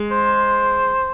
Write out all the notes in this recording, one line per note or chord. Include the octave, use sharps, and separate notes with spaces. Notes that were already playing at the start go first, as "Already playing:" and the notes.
Already playing: G#3
C5